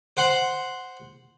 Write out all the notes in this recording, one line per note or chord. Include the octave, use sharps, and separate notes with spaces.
C5 F#5 C6